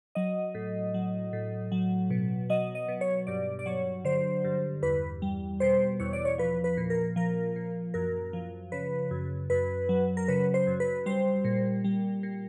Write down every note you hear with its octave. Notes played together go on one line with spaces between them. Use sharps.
F#3 D#5
A2
F#3
A2
F#3
B2
F#3 D#5
D#5
B2
C#5
G2 D5
D5
F#3 C#5
D3 C5
G2
E2 B4
G3
B2 C5
E2 C#5
D5
C#5
F3 B4
B4
A#2
A#4
F3 A#4
A#2
F#2 A#4
F3
C#3 B4
F#2
F#2 B4
F#3
A#4
C#3 B4
C5
F#2
B4
G3 C5
A#2
G3
A#2